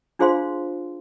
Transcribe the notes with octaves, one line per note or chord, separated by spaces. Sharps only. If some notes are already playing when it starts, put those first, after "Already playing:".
D4 F4 G#4 C5 F5 C6